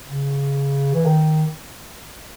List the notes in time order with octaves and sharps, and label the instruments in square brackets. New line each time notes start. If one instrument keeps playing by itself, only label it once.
[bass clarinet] C#3
E3
D#3